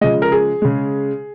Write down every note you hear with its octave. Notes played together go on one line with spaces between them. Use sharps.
C#3 F3 G#3 D#5
A#4
G#4
C#3 G#3